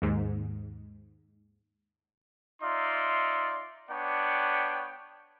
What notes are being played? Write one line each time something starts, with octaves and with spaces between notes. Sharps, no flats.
D#2 G#2
D#4 F4 D5 E5 C6
B3 D4 C#5 D5 G5